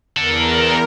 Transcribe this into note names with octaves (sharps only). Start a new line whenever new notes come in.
E2 D4 A4 A#4